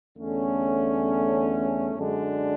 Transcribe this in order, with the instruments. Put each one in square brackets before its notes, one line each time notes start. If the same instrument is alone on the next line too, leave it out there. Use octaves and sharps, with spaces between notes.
[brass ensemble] E2 D3 A3 C#4
F#2 D3 G#3 D4